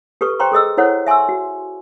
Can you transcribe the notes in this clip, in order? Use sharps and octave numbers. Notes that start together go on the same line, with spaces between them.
G4 A4 B4 C#6
C5 G5 A#5 C6 C#6
G#4 A4 D#5 E6
E4 A4 C5 C#5 F#5
E5 G#5 C6 C#6 E6
F#4